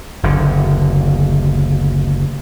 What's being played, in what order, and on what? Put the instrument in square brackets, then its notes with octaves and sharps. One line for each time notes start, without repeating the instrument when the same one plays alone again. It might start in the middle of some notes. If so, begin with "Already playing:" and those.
[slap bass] F#1 D2 D3